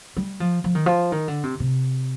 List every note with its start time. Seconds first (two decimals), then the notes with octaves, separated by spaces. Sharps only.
0.17 G3
0.40 F3
0.64 F3
0.75 D#3
0.86 F3
1.12 D#3
1.28 D3
1.43 C3
1.60 C3